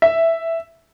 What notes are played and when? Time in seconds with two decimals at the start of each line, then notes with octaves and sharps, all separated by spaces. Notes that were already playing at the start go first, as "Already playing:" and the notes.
0.02 E5